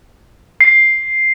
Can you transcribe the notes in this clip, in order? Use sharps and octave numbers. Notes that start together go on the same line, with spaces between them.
C7